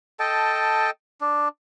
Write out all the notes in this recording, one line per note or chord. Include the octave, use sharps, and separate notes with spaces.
A4 D#5 G5 A5
D4